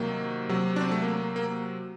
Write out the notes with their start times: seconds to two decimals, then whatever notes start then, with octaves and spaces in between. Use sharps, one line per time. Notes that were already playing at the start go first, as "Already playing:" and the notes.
Already playing: C3 D#3 F#3 A#3
0.49 C3 F#3
0.76 D4
0.81 C4
0.91 A3
1.02 A#3
1.36 A#3